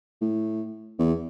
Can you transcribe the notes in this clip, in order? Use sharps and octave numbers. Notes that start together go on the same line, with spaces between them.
A2
E2